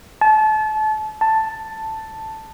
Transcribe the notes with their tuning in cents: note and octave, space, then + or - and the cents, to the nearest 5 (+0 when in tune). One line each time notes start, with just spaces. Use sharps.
A5 -30
A5 +5